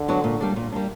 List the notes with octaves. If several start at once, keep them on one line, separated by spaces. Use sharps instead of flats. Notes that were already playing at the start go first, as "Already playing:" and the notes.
Already playing: D3
F#3 B3 D4 F#4
A#2
G3 A#3 D4
A#2
G3 A#3 D4